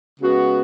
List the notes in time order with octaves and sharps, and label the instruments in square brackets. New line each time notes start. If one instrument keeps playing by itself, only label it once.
[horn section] C#3 G#3 B3 F#4